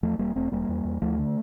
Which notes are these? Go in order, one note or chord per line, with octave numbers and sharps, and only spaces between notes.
E2 F3 A3
E1 G3 A#3
E1 A3 C4
E1 G3 A#3
E2
E2
D2 F3 A3
D3